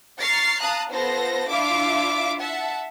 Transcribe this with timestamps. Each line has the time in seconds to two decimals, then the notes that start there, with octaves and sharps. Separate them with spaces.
0.20 A#5 C#6 F6 A6 C7
0.60 F5 A5 A#5 D#6 F#6
0.92 B3 F4 A4 C5 A#6
1.50 D4 E4 F4 E5 F5 D6
2.40 E5 F#5 A5